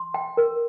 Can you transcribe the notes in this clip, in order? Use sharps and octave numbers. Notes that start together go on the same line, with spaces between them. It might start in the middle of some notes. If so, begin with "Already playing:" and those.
Already playing: C6
G5
A#4